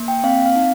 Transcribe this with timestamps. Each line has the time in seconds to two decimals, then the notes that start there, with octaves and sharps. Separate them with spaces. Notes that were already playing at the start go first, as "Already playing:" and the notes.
Already playing: A#3
0.08 G5
0.24 C4 F5
0.46 F5
0.56 D#4